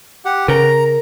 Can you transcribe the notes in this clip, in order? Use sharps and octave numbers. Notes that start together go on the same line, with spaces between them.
G4 F#5
C#3 A#4 A#5